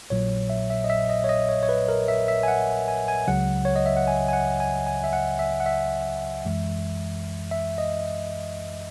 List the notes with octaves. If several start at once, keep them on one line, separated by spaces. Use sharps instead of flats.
A#1 A#2 F#3 C#5
E5
E5
D#5
E5
D#5
C#5
D#5
C#5
C#5
B4
A#4
E5
E5
G#5
F#5
G#5
G#5
C#2 C#3 F#3 F#5
C#5
D#5
E5
F#5
G#5
G#5
F#5
G#5
G#5
E5
F#5
E5
F#5
E5
F#2 E3 G#3
E5
D#5